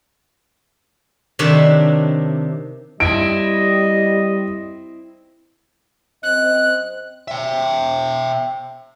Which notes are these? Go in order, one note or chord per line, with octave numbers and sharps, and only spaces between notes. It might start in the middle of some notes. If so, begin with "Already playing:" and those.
C3 D#3 D4 C#5 E5
G3 C4 E4 D#5 D7
F#2 C4 D#5 F#6
E5 G5